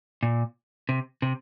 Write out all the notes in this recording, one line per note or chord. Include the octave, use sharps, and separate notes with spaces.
A#2
C3
C3